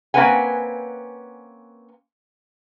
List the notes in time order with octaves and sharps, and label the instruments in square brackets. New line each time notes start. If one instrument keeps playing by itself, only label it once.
[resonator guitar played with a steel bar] A#3 C4 C#4 B4 F#5 G#5